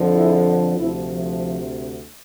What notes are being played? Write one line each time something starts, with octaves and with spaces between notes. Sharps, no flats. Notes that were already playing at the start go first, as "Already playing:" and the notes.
Already playing: F2 D3 F3
E4 G#4
D2 C3 F3 C4 E4
F3 A3